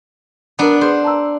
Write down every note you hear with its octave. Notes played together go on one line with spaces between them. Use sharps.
B3 D4 A#4 A#5
G#4 B4 C5
A5 A#5 E6